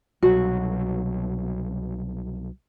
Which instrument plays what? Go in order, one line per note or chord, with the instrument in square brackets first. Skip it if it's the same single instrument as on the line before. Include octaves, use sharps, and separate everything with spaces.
[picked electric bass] C2 B2 F#3 [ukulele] F#4